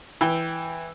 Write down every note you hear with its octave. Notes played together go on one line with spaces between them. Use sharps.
E3 G5